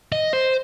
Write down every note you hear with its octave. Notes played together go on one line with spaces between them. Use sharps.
D#5
C5